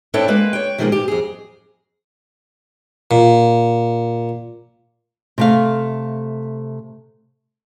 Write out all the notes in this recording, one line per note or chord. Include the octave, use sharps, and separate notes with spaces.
C4 D4 E4 A4 C#5 G5
G#3 A#3 B4
C#5 G5
B2 D#3 F3 F#3 G#3 A#3
G4
F2 G#4
A#2
C3 A3 F5